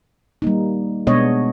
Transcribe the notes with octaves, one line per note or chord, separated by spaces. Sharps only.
G3 A#3 D#4
B2 G#3 B3 D4 C#5 D#5